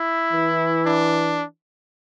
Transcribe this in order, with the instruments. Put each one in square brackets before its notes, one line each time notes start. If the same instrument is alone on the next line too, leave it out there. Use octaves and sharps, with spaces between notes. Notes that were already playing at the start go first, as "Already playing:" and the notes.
Already playing: [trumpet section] E4
[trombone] E3
[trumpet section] D4